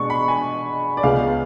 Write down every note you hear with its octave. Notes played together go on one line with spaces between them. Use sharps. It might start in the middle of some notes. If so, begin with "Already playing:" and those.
Already playing: B2 G#3 B3 D4 C#6
B5
G#5
D5
C#2 C#3 G#3 B3 F5